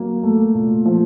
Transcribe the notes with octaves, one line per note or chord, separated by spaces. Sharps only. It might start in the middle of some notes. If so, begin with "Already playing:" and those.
Already playing: F#3 A#3
A3
A#2
F3